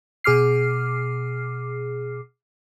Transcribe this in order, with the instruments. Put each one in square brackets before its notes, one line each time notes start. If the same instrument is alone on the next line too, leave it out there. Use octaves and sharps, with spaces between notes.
[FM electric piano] B2 G#4 D6 F6 C7